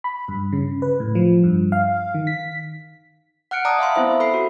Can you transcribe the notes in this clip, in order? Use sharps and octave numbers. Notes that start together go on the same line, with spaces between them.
B5
G2
C#3
B4
A2
F3
G2
F5
D#3
B6
F#5 F6 F#6 C#7 D7
D5 A5 A#5 D6 D#6
E5 F5 B5 C6
B3 C4 E4 C5 E5
A4 B5 C7
F#4